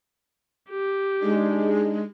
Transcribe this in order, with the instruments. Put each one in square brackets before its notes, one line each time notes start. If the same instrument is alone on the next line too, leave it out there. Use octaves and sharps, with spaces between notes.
[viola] G4
[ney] G#3 [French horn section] D4 D#4 G#4